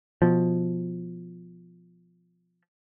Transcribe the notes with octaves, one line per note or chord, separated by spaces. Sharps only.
B2 F3